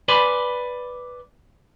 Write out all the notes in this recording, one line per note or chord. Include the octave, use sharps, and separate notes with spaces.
B4 D5 G#5 B5 C6